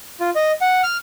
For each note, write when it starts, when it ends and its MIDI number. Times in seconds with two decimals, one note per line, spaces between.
0.20 0.30 65
0.36 0.52 75
0.61 0.81 78
0.83 0.97 89